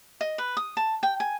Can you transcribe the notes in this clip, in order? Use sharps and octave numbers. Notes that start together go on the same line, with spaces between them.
D#5
B4
D#6
A5
G5
G#5